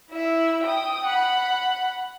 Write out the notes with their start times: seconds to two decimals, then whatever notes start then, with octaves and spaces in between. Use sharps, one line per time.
0.11 E4 E5
0.63 G5 D#6
1.05 F#5 B5